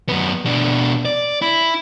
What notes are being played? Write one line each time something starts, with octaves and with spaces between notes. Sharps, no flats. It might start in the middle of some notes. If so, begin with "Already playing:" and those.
F#2 B3
B2 D4
D5
E4